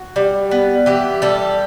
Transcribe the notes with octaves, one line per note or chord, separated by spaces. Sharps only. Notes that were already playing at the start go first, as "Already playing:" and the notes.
Already playing: F#4
G3
B3
E3 G4
G3 A4